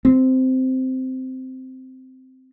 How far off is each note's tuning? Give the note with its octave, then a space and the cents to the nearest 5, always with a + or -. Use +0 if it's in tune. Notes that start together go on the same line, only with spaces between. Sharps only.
C4 -10